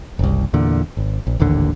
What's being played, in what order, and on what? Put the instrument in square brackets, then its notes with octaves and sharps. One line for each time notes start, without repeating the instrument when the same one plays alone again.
[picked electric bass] F#1 C2
E2 A#2 D3
G#1
A#1
D#1 A1 D#2 D3